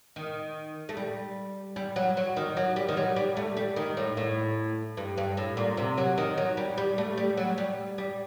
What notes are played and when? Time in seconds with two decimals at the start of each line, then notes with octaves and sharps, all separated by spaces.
0.16 D#3
0.89 A3
0.97 G3
1.76 G3
1.96 F#3
2.17 F#3
2.36 D#3
2.57 F#3
2.76 G3
2.89 D#3
2.97 F#3
3.16 G3
3.37 A3
3.57 G3
3.76 D#3
3.97 A2
4.17 A2
4.97 G2
5.18 G2
5.37 A2
5.57 A#2
5.77 C3
5.98 F#3
6.18 D#3
6.38 F#3
6.57 G3
6.78 G3
6.98 A3
7.18 G3
7.37 F#3
7.58 G3
7.98 G3